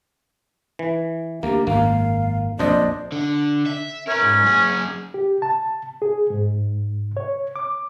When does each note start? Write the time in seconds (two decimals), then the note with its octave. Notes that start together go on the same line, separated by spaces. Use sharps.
0.79 E3
1.43 D2 A#3 G4
1.67 G#1 F#2 A#3 F5
2.59 A#1 F2 D4 C5 D5 D#5
3.12 D3
3.66 E5
4.08 C#4 A#4 B4
4.22 G#2
4.44 F#2 G#4
5.14 G4
5.42 A5
6.02 G#4
6.30 G#2
7.17 C#5
7.56 D6